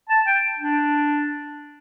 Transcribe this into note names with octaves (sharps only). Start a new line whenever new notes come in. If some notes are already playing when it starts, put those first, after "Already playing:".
A5
G5
D4